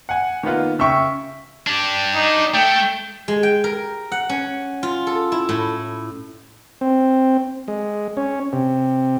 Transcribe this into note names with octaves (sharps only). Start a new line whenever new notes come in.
F#5 G#5
D#3 A#3 B3 F4
C#3 E5 G5 C#6 E6
D4 G4
D#4
A3 G5
G#3
G5
A#4
F#5
C#4
F4
A4
E4
A2
C4
G#3
C#4
C3